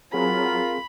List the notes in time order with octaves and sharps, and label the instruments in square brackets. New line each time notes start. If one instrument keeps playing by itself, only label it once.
[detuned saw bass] F#3 [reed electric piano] C4 G#4 [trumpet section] F4 A#4 [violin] B5